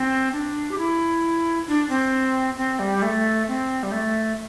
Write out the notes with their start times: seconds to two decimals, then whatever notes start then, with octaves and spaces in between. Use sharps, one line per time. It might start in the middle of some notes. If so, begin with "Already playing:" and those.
Already playing: C4
0.33 D4
0.71 G4
0.78 E4
1.68 D4
1.90 C4
2.57 C4
2.79 G3
3.02 A3
3.48 C4
3.83 G3
3.92 A3